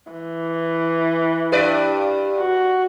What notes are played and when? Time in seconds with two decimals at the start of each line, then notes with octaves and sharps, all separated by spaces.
0.12 E3
1.52 G2 B4 D5
2.39 F#4